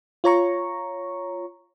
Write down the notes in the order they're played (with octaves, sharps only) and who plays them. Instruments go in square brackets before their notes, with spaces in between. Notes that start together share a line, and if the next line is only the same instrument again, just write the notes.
[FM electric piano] F4 C#5 A#5 C#6